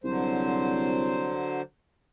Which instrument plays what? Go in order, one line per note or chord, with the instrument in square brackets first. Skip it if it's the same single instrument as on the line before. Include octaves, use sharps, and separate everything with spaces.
[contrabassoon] C2 [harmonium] D3 F#3 C5